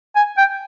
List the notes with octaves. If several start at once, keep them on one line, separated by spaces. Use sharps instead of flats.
G#5
G5